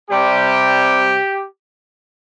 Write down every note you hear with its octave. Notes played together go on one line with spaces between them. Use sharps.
C3 G3 G4